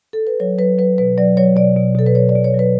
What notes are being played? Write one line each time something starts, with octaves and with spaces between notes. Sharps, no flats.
A4
B4
F#3 C#5
F#3 B4
F#3 B4
B2 B4
F#3 D5
F#3 C#5
B2 D5
B2
B2 A4
B4
F#3 C#5
D5
B2
C#5
F#3
B4